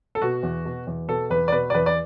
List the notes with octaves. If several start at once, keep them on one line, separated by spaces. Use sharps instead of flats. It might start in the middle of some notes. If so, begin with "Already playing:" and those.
A4
B2 F#4
E2
B2
E2
B2 A4
E2 B4
D5
B2 B4
D5
E2 B4
D5